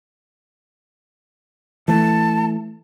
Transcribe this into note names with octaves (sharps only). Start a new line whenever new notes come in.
E3 A3 A5